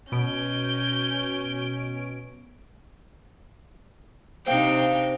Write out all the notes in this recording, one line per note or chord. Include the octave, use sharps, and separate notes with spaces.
B2 C#4 G6 D7
C3 D4 D#4 C5 F5 G5